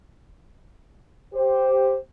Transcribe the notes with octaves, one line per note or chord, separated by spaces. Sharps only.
G4 C5